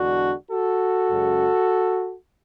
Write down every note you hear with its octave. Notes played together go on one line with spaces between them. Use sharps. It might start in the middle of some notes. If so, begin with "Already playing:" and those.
Already playing: E2 D3 G#3 D4 F#4
F#4 A4
F#2 C#3 G#3